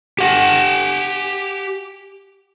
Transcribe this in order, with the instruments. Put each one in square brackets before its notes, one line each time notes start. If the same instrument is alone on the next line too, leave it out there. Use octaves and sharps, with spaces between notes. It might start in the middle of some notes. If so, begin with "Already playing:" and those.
[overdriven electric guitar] G4 F#5